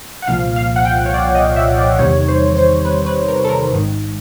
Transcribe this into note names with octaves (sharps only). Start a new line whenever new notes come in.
F#5
C2 A#2 F3 F5
F5
F#5
G5
C#5
D5
D#5
E5
D5
E2 C3 D#3 G3 C#5
C5
C5
B4
B4
A#4
A4
A#4
A1 G#2 D#3